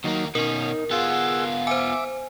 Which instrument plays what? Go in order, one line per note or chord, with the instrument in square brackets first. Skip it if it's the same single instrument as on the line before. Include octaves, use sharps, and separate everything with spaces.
[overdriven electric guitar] D#2 A#3 [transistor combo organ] F#3 D#4
[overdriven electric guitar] B2 C#4 [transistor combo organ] D#4 [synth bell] A#4
[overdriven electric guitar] B3 F4 [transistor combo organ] G#4 F#5 E6
[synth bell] C5 G#5 [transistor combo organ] E5 D6